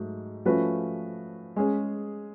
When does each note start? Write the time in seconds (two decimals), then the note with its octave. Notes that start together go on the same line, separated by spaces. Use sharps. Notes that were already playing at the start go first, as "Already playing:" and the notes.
Already playing: G#2 F#3 A3
0.45 F3 A3 C#4 F#4 B4
1.56 G#3 C#4 G#4